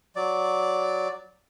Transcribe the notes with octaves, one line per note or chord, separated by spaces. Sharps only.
F#3 D5